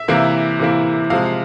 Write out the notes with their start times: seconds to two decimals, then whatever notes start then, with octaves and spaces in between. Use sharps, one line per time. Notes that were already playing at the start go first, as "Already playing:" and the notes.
Already playing: E5
0.08 C3 E3 A#3 E4
0.59 C3 E3 A#3 E4
1.10 C3 F3 G#3 F5